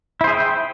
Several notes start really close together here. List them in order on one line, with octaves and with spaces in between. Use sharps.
E4 C5 G#4 E5 G5